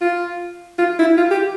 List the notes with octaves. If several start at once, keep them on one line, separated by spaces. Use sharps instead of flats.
F4
F4
E4
F4
G4